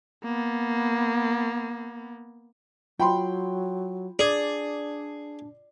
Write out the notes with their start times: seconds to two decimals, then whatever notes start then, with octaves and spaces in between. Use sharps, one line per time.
0.24 A#3 B3
3.00 F#3 F4 G5 B5 C6
4.19 D4 G#4 D5